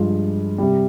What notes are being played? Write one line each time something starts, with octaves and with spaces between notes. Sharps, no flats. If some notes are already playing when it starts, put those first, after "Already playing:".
Already playing: G2 F3 G#3 F4
C3 G3